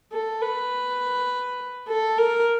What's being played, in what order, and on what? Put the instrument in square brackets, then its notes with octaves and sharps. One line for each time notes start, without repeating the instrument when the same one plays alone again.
[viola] A4
B4
A4
A#4